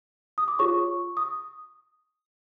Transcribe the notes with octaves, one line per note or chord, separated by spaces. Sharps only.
D#6
D6
F4 G#4 C#5 C#6
D#6